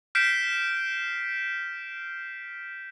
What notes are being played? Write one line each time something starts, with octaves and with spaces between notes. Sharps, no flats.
F6 G6 B6 C7 D7 E7